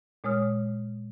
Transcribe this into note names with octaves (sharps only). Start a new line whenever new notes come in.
A#2 G#3 C#5 D#6 F6